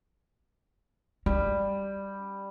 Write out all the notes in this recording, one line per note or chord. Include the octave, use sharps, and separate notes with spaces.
G3 C#4